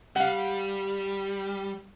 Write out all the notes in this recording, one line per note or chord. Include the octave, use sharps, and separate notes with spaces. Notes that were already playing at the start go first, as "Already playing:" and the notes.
G3 F5 F#5